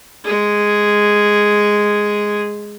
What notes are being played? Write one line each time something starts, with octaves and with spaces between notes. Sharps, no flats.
G#3 G#4